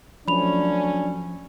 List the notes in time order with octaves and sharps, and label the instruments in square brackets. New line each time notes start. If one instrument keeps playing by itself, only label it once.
[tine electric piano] F3 [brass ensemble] F#3 A3 C#4 [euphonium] D4 [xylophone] B5 F7